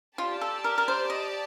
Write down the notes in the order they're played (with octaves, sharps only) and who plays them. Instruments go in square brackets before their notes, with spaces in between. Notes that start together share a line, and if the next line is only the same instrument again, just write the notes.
[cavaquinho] F4 [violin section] G4 D5 A5
[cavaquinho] A4
A#4
A#4
C5
D#5